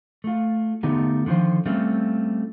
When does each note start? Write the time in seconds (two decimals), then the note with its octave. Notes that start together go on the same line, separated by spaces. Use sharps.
0.24 A3 F4
0.83 D3 A3 B3 D#4 G4
1.26 D3 D#3 F3 F4 C5
1.66 G3 A3 C4 C#4 F4